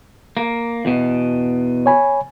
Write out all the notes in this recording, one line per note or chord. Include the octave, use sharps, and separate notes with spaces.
A#3
E2 B2
C#5 G#5 B5